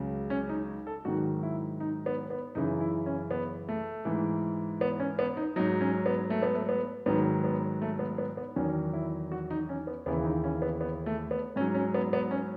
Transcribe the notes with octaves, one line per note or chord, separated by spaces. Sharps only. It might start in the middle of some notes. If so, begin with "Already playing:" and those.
Already playing: C#2 C#3 F#3
C#4
D#4
A4
G#2 D#3 F#3 F#4
E4
D#4
B3
B3
F#2 C#3 E3 D#4
E4
C#4
B3
A3
G#2 E3
B3
C#4
B3
D#4
G#2 F#3 D#4
C#4
B3
A3
B3
A3
B3
G#2 D#3 F#3 B3
B3
A3
B3
B3
B3
E2 D#3 F#3 C#4
E4
F#4
D#4
C#4
B3
D#2 C#3 E3 B3
D#4
C#4
B3
B3
A3
B3
G#2 F#3 C#4
C#4
B3
B3
C#4